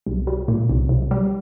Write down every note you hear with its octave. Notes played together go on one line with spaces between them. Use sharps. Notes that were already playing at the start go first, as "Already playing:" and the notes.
C2
G3
A#2
C2
C2
G3